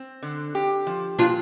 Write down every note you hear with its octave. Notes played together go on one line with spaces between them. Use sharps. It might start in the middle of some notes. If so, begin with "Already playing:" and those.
Already playing: C4
D3
G4
F3
A#2 D4 F4